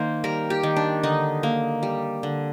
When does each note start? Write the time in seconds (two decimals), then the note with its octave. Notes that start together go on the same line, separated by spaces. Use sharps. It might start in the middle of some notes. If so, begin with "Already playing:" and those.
Already playing: D#3 A#3 C5
0.24 G3 A#4
0.50 G4
0.63 D#3
0.76 D4
1.03 D3 D#4
1.43 A#3
1.83 G3
2.23 D3